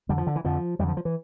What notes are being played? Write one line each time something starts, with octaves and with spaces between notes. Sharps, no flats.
F2 D3 G3
F3
D3
E3
F2 D3 F3
F2 D3 F3 G3
F3
E3